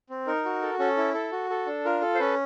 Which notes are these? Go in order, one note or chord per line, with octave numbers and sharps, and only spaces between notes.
C4
D#4 A#4
F#4
A4
C#4 A4
E4
A4
F#4
A4
D4
F4 A#4
A4
C5
C#4 B4